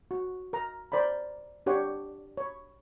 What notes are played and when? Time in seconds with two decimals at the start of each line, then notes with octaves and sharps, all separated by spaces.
0.11 F#4
0.53 A#4 A#5
0.92 A#4 C5 D5 A#5 B5
1.66 D4 G4 C#5 F#5 C6
2.37 C#5 B5